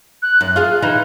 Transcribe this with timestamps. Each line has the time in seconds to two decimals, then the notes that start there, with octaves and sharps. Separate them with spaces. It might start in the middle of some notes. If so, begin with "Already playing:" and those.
0.22 F#6
0.41 F#2
0.56 F4 G#4 F6
0.82 E3 D#4 E4 F#6